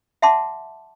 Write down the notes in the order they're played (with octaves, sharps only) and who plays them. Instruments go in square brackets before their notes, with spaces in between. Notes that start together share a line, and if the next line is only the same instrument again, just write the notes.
[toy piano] E5 F#5 A5 C6 D6